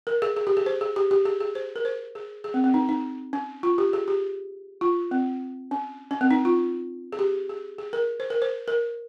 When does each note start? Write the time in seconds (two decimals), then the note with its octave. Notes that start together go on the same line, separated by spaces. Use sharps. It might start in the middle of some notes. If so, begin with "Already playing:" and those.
0.07 A#4
0.22 G#4
0.36 G#4
0.47 G4
0.57 G#4
0.66 C5
0.81 G#4
0.96 G4
1.11 G4
1.26 G#4
1.40 G#4
1.55 C5
1.76 A#4
1.85 C5
2.15 G#4
2.44 G#4
2.54 C4
2.64 C4
2.74 D#4
2.89 D#4
3.33 C#4
3.63 F4
3.78 G4
3.93 G#4
4.08 G4
4.81 F4
5.11 C4
5.71 C#4
6.11 C#4
6.21 C4
6.31 D#4
6.45 F4
7.13 G#4
7.19 G4
7.49 G#4
7.78 G#4
7.93 A#4
8.20 C5
8.30 A#4
8.42 C5
8.68 A#4